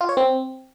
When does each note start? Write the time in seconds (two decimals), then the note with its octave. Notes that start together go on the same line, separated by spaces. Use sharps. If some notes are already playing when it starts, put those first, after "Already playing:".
0.01 F4
0.09 C#5
0.17 C4